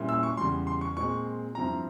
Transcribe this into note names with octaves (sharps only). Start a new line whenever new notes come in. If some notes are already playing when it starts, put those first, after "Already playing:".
Already playing: A#2 G3 C#4 E4
E6
C#6
E2 C#3 G3 C6
C6
C#6
A#2 G#3 C4 C#6
G2 F3 C4 E4 A#5